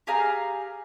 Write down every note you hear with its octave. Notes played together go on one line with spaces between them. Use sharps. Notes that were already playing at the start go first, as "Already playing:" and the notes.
G4 G#4 F5 A#5